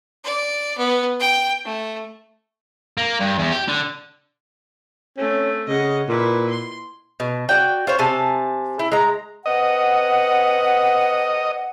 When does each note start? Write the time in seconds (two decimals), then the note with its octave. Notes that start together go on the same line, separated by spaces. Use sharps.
0.24 D5
0.78 B3
1.20 G5
1.66 A3
2.98 A#3
3.21 G2
3.39 E2
3.52 G4
3.68 D3
5.18 A3 C4 C#4
5.68 C#3 D#5 F#5
6.09 A#2 E4 B4
6.50 C6
7.20 B2
7.49 F#4 D5 G5
7.87 F4 C5 C#5
7.99 C3 G#5 A5
8.79 E4
8.92 G#3 A#5
9.46 C4 B4 D#5 F#5